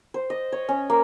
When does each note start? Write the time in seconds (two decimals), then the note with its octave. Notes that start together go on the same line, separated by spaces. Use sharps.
0.14 C5
0.30 D#5
0.52 C#5
0.69 C#4
0.90 A#3